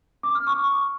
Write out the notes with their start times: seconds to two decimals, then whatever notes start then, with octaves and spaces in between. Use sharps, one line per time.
0.23 D6
0.35 F6
0.47 C#6